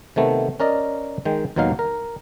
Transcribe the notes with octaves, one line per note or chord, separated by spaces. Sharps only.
C3 D#3 A3 B3
C#4 A#4 D5 D#5
D#3 G#3 G5
D#2 B2 F#3 D#4 F5
A#4